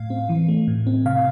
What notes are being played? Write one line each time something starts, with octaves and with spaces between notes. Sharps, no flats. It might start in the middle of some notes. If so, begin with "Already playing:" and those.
Already playing: A2 F5
C4
E3
A3
A2
C4
C3 F5